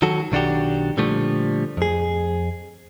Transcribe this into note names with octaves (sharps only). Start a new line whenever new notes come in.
D#3 F#3 F#4 A4
B1 D#3 D4 F#4 G4
A#2 D3 F3 G3 A3
F2 G#4